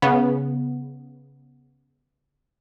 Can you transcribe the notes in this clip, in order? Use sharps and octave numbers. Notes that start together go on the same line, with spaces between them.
C#3 B3